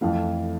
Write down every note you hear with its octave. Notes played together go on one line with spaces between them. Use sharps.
F2 E3 A3 F5